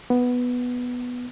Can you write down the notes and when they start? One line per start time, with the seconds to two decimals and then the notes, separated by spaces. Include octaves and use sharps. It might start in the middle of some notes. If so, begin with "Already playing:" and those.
0.10 B3